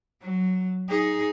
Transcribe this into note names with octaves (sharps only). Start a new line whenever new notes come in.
F#3
D#4 G#4